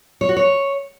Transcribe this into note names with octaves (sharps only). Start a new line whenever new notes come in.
C#5
F#4
C#5